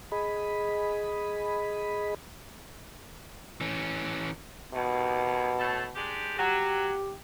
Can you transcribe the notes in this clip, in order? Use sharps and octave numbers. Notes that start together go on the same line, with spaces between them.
G#4 D#5 B5
E3 C#4
D#2 B2
A2 A3 A4
G#3 D4 G4
F#3 G4